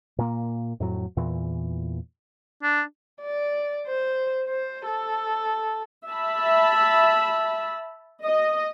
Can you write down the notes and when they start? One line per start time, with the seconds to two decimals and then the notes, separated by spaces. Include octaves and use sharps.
0.18 A#2 A#3
0.80 F2 A2 F#3
1.17 E2 A#2 E3
2.63 D4
3.21 D5
3.87 C5
4.47 C5
4.86 A4
6.06 E5 A5 B5
8.22 D#5